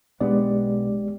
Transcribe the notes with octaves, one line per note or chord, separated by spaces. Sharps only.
B1 G#3 B3 D4 G4 D5